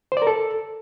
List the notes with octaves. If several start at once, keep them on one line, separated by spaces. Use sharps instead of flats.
C5
D5
A#4
A4